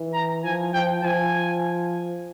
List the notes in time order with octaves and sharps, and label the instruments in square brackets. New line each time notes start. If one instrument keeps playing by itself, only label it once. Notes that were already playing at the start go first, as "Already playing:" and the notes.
Already playing: [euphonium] E3
[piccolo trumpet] A#5
[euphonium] F3 [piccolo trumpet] G#5
[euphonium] F3 [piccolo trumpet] G5
[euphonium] F3 [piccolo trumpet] G#5